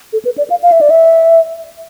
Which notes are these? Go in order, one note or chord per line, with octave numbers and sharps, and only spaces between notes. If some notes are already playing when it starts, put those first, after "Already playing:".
A4
B4
D5
F5
F5
E5
D5
E5